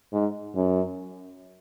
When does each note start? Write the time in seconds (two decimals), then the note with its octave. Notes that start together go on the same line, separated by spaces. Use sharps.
0.12 G#2
0.55 F#2